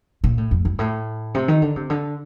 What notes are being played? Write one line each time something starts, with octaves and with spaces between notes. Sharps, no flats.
A#2
A2
F2
G2
A2
C3
D#3
D3
C3
D3